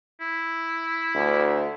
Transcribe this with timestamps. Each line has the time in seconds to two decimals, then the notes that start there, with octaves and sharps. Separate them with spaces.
0.21 E4
1.15 D2